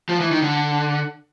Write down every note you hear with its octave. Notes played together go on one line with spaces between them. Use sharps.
F3
E3
D#3
D3